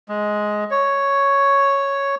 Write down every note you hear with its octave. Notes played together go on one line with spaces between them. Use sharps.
G#3
C#5